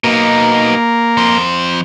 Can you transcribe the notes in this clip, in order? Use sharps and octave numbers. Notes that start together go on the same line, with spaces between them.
B2 A#3 D#4
F2 C5